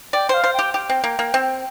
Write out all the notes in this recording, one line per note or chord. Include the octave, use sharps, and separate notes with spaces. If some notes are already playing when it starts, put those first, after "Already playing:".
D5 G5
C5 F5
C5
G5
G4
G4 G5
C4
A#3
A#3
C4